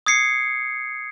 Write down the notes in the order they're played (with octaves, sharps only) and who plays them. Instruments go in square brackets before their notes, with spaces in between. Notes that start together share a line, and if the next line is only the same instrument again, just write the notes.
[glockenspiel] D#6 G#6 C7 C#7